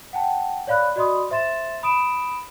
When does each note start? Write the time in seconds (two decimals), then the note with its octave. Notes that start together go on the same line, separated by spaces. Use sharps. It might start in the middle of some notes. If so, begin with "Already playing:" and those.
0.13 F#5 G5 A5
0.67 C#5 D5 F5 B5 F#6
0.96 F#4 D5 D#5 B5 C6 D#6
1.30 C5 E5 C6 A6 E7
1.83 B5 D#6 D7 E7